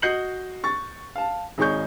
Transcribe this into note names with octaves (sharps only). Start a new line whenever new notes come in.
F#4 D#5 G6 C7 C#7 F#7
C#6 A6
F5 A5
G#1 D#4 G#4 C#5 C#6 G6